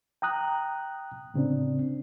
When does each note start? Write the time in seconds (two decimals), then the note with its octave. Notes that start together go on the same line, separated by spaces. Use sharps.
0.22 G5 A#5 D#6 F#6
1.34 A2 C#3 C4 D4